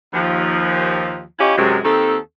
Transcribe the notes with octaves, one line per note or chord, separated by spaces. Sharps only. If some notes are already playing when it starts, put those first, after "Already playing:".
D#2 F3
C#4 E4 F4 G4 C#5 D#5
F#2 C3 G#3
D#2 D#3 C4 A4